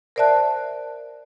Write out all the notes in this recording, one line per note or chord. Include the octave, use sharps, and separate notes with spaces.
A#4 C5 D5 E5 A5 F#6